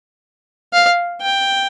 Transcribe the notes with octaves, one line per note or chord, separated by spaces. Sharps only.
F5
G5